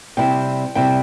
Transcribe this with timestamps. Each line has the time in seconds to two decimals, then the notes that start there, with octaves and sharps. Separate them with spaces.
0.17 C3 G3 C4 E4 G5
0.75 C3 G3 C4 E4 G5